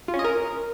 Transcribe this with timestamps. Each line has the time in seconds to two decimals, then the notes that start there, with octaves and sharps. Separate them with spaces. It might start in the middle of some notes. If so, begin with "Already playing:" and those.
0.08 F4
0.14 C#4
0.19 D#5
0.24 A#4